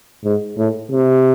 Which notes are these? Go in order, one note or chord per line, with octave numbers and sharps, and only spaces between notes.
G#2
A2
C3